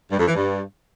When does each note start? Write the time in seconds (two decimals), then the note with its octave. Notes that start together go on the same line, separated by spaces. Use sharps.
0.12 G2
0.19 F2
0.27 E3
0.35 G2